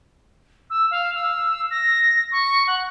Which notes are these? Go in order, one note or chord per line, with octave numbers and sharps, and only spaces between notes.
E6
F5
E6
A#6
C#6
F#5